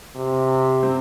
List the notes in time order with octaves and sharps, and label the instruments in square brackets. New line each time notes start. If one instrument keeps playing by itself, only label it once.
[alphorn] C3
[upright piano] C4